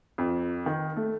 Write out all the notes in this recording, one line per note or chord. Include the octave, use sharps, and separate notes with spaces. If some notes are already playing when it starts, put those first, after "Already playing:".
F2
D#3
A3